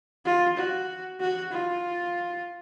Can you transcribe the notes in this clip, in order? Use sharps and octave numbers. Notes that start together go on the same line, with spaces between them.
F4
F#4
F#4
F4